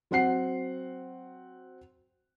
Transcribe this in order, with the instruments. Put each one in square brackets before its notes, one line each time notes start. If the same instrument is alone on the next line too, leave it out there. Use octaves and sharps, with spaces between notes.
[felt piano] F#3 C4 F#5 C7